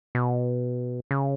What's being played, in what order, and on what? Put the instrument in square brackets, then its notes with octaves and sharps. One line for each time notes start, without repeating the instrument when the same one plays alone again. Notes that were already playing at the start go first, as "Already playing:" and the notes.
[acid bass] B2
C#3